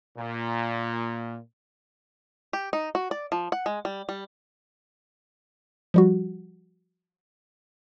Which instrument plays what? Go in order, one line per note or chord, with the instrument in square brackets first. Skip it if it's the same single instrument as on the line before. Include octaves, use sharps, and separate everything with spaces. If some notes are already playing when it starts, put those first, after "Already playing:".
[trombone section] A#2
[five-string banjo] G4
D#4
F#4
D5
F3
F#5
G#3
G3
G3
[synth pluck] F3 G3 F#4